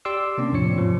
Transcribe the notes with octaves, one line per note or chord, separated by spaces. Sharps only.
G4 D5 C6 D6 E6
C3 A#3 C#4 D4
E2 A2 F3 C#5 C#7
G#2 C3 F3